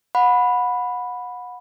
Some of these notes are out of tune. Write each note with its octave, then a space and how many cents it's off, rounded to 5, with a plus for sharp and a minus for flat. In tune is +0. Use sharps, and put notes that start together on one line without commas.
F#5 -30 B5 +0